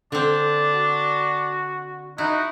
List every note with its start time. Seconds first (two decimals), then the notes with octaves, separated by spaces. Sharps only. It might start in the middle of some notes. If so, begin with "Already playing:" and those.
0.12 D3 C4 D4
0.74 F#4
2.18 D#4 E4 F#4